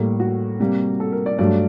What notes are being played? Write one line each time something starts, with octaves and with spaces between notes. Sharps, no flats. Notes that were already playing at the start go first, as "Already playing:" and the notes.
Already playing: A2 G3 A#3
F#4
C3 G3 A#3
A4
A#4
D5
G2 F#3 A3 D5